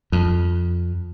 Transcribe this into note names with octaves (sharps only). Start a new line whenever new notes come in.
F2